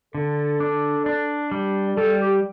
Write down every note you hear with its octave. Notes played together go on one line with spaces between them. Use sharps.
D3 A4
D4
D4
G3
G3 A4
G4